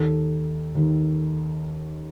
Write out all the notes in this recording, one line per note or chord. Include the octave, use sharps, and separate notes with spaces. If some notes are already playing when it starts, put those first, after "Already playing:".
Already playing: D#2 D#3 A4
D#2 D#3